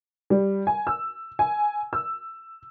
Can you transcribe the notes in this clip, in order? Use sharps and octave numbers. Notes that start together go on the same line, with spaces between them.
G3
G#5
E6
G#5
E6